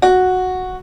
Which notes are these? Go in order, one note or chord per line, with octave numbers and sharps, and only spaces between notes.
F#4